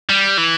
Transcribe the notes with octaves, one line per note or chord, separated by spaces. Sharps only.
G3
E3